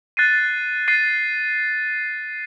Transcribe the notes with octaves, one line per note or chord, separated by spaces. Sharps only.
F#6 A6 C7 D#7
F#6 A6 C7 D#7